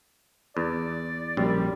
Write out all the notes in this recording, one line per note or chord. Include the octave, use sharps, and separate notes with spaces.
E2 D5
A#1 F#2 G3